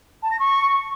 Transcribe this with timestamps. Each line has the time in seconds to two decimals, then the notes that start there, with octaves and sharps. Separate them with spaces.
0.23 A5
0.31 A#6
0.39 C#6